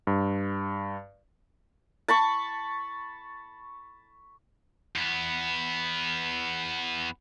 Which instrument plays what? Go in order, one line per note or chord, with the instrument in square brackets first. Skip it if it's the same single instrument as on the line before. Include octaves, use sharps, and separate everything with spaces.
[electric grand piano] G2
[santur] A5 B5 C#6
[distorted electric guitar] E2 B3